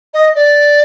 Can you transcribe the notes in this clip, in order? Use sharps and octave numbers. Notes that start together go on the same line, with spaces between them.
D#5
D5